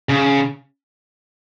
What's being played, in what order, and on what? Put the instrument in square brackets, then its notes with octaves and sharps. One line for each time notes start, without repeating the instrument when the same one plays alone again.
[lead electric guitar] C#3